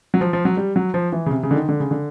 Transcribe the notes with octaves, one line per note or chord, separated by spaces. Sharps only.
F#3
F3
F3
F#3
G3
F#3
F3
E3
C#3
C3
C#3
D3
D#3
D3
C#3
D3